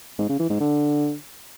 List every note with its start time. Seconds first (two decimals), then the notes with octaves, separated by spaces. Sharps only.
0.19 G#2
0.29 C#3
0.39 E3
0.50 G#2
0.60 D3